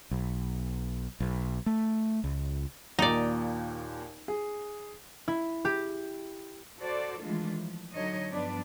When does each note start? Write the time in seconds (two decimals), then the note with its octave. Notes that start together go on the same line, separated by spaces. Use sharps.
0.11 B1
1.20 B1
1.66 A3
2.24 C#2
2.99 D#2 A#2 D#4 D5
4.28 G#4
5.28 E4
5.65 G4
6.79 F#4 A4 C5 D5
7.21 D#3 E3 G#3 A3 D4 F4
7.58 F3
7.94 D3 F#3 D#4 C#5 D#5
8.30 G2 F3 B3 D4 B4 D5